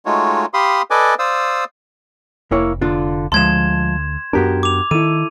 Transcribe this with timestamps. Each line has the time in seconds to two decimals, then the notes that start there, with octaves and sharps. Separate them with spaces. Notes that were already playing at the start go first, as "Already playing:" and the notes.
0.06 G#3 A3 D#4 F4 F#4 C#5
0.54 G4 F5 B5 C6 D#6
0.91 A4 B4 D5 D#5 G#5 D6
1.19 C5 D5 F5 D#6 E6
2.51 F1 A#3 E4 C#5
2.81 D3 D4 F4
3.32 D2 F3 G#3 A5 C6 G#6 E7
4.33 F#2 B3 D4 F#4 G4 A#4
4.63 D6 F7
4.91 D#3 E4 A4 D#7